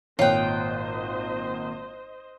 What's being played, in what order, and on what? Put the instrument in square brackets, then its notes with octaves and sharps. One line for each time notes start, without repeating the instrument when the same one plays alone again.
[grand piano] G#1 A#2 F#6 [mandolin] F4 G5 [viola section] C5 D#5 [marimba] C#5